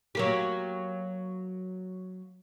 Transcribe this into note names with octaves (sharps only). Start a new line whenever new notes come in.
F#3 A#3 G4